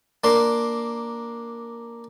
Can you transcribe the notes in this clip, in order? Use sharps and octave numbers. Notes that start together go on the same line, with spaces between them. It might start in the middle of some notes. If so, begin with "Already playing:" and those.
A#3 D4 C6